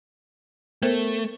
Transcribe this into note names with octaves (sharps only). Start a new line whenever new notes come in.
A3 B3 A#4 C5